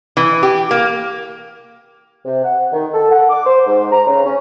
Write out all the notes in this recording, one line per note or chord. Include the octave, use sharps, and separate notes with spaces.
E3
G4
A#3
C3
F#5
D#3
A4
F#5
D6
C5
G#2
A#5
C#3
C#4